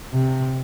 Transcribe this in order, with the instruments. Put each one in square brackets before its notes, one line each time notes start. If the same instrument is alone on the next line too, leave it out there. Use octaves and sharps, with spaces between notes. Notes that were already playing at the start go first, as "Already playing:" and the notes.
[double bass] C3